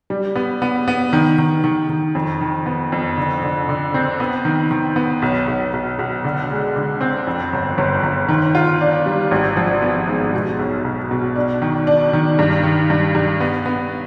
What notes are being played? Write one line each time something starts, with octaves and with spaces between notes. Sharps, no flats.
G3
B3
B3
B3
D#3
D#3
D#3
D#3
F2
D#3
B3
F2
D3
D3
D3
C4
B3
D#3
D#3
B3
B1
B1
B1
B1
D3
G#3
D3
C4
F2
G1
G1
G1
D#3
F4
D4
G3
G#1
F3
B3
G#2
B2
B1
B1
B2
D4
D#3
D4
D#3
G2
D#3
G2
G2
B3
B3